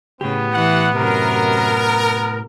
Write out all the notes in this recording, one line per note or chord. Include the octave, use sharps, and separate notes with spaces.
A2 C#3 B3 G4
E3 F#5
F#2 C3 A#4